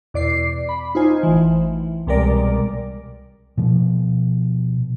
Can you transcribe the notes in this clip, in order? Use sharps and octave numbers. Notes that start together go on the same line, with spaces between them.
E2 B2 D5 D6 C7
B5
D#4 F4 C5 G#5
A1 E3
C2 B2 G3 G#3 A#4 D5
B2 F3